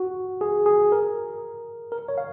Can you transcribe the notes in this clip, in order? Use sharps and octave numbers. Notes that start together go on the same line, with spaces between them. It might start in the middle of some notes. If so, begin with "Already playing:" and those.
Already playing: F#4
G#4
G#4
A#4
A#4
C#5
F5